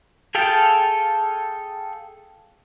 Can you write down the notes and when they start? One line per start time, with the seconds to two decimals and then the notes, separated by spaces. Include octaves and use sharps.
0.35 G#4 A4 F5 G5 A5